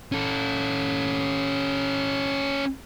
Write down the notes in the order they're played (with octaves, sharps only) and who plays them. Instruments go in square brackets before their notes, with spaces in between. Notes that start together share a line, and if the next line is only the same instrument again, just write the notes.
[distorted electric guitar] C#4 A4